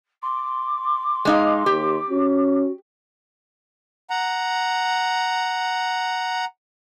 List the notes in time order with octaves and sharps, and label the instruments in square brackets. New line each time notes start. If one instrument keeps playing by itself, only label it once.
[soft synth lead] C6 [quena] D6
[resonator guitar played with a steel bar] G#3 D#4 F5
[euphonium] D#2 [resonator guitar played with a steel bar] G4
[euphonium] C#4 [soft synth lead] F#4
[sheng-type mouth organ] F#5 A#5